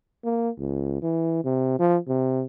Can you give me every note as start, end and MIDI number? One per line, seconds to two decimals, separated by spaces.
0.24 0.50 58
0.58 0.97 37
1.02 1.41 52
1.44 1.75 48
1.79 1.98 53
2.08 2.44 48